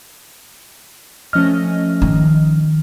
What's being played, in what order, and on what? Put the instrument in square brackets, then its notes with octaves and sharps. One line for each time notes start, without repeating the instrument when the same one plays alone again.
[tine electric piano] F3 F6 [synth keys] A3 C#4 D#5
[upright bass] D#3